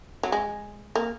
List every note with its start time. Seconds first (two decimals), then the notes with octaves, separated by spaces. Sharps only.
0.23 F#3
0.32 G#3
0.95 A#3